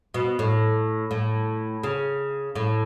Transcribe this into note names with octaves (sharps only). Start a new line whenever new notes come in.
B2
A2
A2
C#3
A2